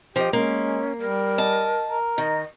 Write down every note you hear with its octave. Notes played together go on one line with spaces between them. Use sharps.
F3 G4 D#5
G#3 A#3 C#4
G3 A#4
D#5 A5
A#4
D#3 D#5